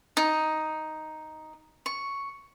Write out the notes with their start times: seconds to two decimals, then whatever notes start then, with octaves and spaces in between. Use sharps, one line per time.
0.17 D#4
1.86 C#6